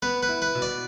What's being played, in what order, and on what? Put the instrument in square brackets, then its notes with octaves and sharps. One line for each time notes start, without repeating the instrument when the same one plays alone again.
[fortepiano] B3 [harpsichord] B4
[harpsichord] B4
[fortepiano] E4
[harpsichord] B4
[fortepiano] B2
[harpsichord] D5